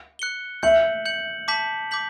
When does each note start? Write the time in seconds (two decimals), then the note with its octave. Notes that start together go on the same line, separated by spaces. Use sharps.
0.19 F#6 C#7 G7
0.63 E5 G6 C#7 F#7
1.06 G6 C#7 F#7
1.48 A5 D6 G6 B6 F#7
1.91 D6 G6 B6 F#7